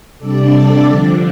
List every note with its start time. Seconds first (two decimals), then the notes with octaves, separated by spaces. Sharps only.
0.19 C3 G3 D4 A4 D5
0.52 A4
0.85 D3 F3 D4